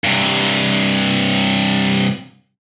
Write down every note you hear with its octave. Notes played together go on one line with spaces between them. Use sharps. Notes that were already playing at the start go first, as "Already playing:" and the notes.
G2 C3